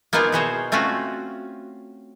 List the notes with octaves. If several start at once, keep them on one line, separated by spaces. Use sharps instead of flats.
A#3 B3 D#4 F4 G#4 A#4
B2 E4 F#4 G#4 C5 C#5
A3 C4 C#4 F4 F#4